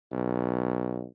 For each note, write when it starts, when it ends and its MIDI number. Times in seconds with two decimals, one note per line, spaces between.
0.12 1.03 35